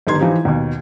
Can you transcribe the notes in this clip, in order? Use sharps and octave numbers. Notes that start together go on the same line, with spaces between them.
G1 D#3 G4 C6 G#6
E3 F3 D#4 G4
D#2 B2